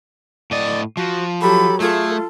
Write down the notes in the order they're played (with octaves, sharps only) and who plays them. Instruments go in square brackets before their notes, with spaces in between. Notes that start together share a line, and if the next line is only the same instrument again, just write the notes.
[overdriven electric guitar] A2 D#5 [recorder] D5
[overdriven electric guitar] F3 [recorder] F#4
[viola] F#3 G4 [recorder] A4 [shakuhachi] B5
[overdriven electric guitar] A3 [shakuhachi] F4 [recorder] G#4 [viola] A4